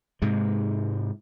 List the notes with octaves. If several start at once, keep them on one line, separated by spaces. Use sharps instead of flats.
G#2 C3 G#3